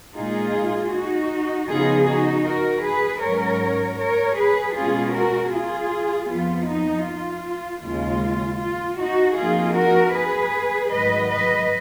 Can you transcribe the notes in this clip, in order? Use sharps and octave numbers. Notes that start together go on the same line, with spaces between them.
A#2 G#3 D#4 F4 G#4
D#4 F#4
C#3 F3 B3 D#4 F4 G#4
D#4 F#4
F#4 A#4
G#4 B4
G#2 F#3 C#4 A#4 C#5
A#4 C#5
G#4 B4
B2 G#3 C#4 F4 G#4
F#4 A#4
F4 G#4
F2 F3 B3 F4
D#4
F4
D#2 C#3 G#3 F4
F4
D#4 F#4
F2 F3 A#3 D#4 F4 G#4
F#4 A#4
G#4 B4
G#2 D#3 F#3 B4 D#5
B4 D#5